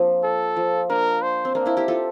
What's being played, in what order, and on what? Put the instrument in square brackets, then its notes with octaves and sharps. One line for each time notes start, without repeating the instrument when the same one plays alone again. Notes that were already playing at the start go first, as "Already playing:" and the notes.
Already playing: [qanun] F3 A#3 C4 D4
[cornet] A4
[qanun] F3
[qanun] A#3 D4 [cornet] A#4
[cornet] C5
[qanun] C4
[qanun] A#3 D4 [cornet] A#4
[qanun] C4 E4
E4 G4
F4 A4